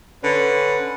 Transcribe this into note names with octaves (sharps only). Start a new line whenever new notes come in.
D3 C#4 B4